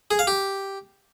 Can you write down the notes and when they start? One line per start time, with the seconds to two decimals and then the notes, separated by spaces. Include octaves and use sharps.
0.11 G#4
0.19 F5
0.27 G4